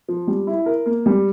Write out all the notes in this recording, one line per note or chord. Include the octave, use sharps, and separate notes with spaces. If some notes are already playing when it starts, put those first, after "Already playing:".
F3
G3
E4
A#4
A#3
G3